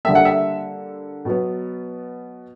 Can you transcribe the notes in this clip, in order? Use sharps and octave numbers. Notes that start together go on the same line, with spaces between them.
D3 G3 A#3 E5
F#5
E5
B2 F#3 B3